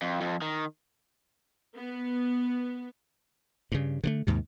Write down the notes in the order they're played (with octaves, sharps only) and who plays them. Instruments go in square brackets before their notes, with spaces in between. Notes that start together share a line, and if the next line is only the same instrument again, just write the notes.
[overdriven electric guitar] F2
F2
D#3
[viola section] B3
[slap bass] G2 C#3
D3 D#3 A3
D#2 G#2 C3